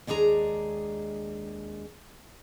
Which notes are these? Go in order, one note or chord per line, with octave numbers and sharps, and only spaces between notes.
D#2 G#3 D4 G#4 A#5